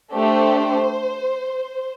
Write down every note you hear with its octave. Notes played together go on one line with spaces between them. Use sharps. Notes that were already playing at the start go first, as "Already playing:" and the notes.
A3 D4 G4 C5